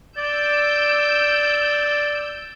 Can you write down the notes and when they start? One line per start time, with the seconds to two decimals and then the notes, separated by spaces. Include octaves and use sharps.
0.17 D5 E6 G6